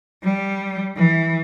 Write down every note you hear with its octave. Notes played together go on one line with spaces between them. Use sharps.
G3
E3